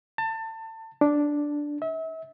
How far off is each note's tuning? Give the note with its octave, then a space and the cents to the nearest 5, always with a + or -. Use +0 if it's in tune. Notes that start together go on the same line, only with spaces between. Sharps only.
A5 +25
D4 -5
E5 -35